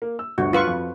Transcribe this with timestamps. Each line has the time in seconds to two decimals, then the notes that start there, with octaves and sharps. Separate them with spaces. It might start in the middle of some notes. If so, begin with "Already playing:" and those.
0.02 A#3
0.19 E6
0.38 G1 D2 G2 F#4
0.53 F4 B4 C#6
0.67 F2